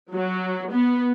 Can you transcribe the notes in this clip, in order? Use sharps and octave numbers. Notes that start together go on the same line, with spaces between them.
F#3
B3